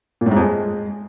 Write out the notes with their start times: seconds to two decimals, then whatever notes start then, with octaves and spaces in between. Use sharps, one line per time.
0.21 A#2
0.26 A2
0.31 G#2
0.36 F2
0.42 G#3